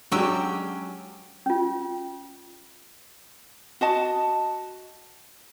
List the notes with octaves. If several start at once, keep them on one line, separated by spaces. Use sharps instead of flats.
F#3 G#3 C#4 D4 G4 G5 E6
C#4 F4
F#4 D#5 A5